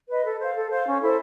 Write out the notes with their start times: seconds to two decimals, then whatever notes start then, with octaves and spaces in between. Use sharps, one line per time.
0.09 B4 D#5
0.24 A4
0.39 C5
0.44 F5
0.55 A4
0.70 C5 F5
0.85 C#4
1.00 E4 A4 C5